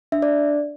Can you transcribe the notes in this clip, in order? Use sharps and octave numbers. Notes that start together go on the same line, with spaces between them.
D4 E5
D5